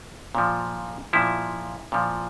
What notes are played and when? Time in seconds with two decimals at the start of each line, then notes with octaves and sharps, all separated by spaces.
0.35 A#2 F3
1.13 A#2 F3 E4
1.92 A#2 F3